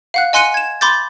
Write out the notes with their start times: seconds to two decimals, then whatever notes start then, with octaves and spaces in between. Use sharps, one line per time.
0.14 F5 F#5 F#6
0.33 D#5 G#5 C6 F#6 C#7 D#7
0.54 G#6 E7
0.81 B5 C6 D6 G6 A6